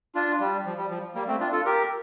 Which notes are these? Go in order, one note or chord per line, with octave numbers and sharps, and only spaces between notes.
D4 F4
G3
F3
G3
F3
G3 A#3
A3 C4
D4 F4
F4 A4
G4 A#4